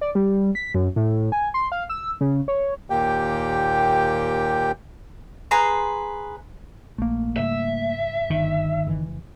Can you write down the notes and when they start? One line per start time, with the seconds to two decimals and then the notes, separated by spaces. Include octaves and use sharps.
0.01 D5
0.15 G3
0.55 B6
0.74 F#2
0.96 A2
1.32 G#5
1.54 C6
1.72 F5
1.90 E6
2.21 C#3
2.48 C#5
2.90 D#2 A#2 A#3 G4 G5
5.51 G#4 B4 A#5 C6
6.98 A#1 A3 A#3
7.37 G#2 C#3 G3 E5
8.30 G1 D#3
8.85 F1 C#3 E3